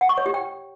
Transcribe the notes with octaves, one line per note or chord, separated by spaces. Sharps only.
F#5
C#6
C#5
G4
G5